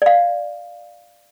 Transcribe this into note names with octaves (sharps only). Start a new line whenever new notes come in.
D5 F5